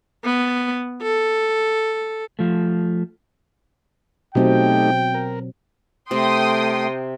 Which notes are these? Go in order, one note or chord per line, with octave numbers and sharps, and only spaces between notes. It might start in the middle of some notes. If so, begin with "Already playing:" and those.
B3
A4
F3 A3
B2 F#3 A3 C4 D#4 G4 G5
A#4
C3 A3 G5 C6 D#6